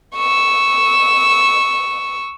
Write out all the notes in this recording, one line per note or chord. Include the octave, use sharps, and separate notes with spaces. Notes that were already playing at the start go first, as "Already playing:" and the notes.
C#6 E6